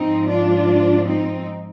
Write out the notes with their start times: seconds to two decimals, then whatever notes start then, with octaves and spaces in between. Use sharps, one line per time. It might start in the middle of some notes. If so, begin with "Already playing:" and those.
Already playing: G#2 F3 G#3 C4 D#4
0.27 D4 F4
1.05 C4 D#4